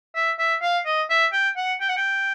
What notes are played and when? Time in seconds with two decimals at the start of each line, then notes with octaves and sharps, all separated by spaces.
0.15 E5
0.39 E5
0.62 F5
0.86 D#5
1.10 E5
1.33 G5
1.57 F#5
1.81 G5
1.89 F#5
1.97 G5